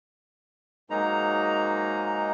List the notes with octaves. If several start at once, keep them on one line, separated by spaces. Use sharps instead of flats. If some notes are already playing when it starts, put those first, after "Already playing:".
G#2 F#3 G#3 A#3 D#4 A#5